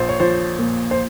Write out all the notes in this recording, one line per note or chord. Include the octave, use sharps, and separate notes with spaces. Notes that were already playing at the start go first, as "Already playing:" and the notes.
Already playing: A#1 C5
C#5
F3 C5
A#2
C5